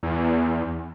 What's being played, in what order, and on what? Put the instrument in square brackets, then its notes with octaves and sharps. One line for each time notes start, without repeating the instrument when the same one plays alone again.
[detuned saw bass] E2